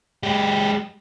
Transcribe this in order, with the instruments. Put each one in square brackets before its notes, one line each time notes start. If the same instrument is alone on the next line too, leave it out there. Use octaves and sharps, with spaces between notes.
[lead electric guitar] G#3 G4